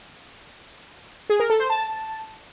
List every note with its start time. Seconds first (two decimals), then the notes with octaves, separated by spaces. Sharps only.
1.30 G#4
1.40 A#4
1.50 A4
1.60 C5
1.70 A5